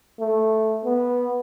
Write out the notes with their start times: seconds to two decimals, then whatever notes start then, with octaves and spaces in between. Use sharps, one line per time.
0.20 A3
0.85 B3